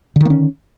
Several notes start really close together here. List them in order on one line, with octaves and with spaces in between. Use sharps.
D3 D#3 A#3 C#4